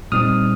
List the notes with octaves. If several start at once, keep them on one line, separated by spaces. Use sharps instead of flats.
A#2 G3 C4 D#4 D#6 F6